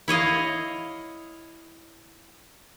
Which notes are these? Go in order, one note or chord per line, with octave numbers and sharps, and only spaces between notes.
E4 C#5 D#5 F5